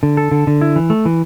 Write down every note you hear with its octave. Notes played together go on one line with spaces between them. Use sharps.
D3
A4
D3
D3
E4
E3
A3
E3